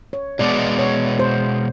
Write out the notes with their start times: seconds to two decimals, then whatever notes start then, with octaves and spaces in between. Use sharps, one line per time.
0.13 C#5
0.39 B2 G#3 B3 D5
0.79 C#5
1.19 C5